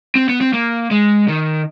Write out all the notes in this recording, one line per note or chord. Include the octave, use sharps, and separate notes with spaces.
C4
B3
C4
A#3
G#3
D#3